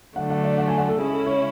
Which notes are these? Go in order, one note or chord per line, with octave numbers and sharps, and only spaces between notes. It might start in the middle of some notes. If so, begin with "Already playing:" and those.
D3 F#3 A3 D4 F#5
F#5
D5
F#5
G#5
F#5
A4
C#3 G#3 C#4 E4 G#4
A4
C#5